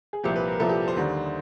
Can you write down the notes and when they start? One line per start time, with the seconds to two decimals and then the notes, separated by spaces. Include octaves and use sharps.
0.13 G#4
0.24 C2 A#2 F3 G4
0.36 B4
0.48 A#4
0.60 C2 A#2 F3 A4
0.69 G4
0.88 C5
0.97 D#2 D3 G3